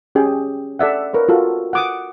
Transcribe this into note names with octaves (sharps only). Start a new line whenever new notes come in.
C#4 G4 G#4 G5
A4 D5 E5 F#5
A#4 B4 C#5
F4 F#4 A4
F#5 D6 D#6